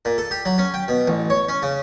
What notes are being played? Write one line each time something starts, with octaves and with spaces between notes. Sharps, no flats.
A#2
A4
G4
F#3
C#4
G5
B2
A1
C#5
C#4
C#3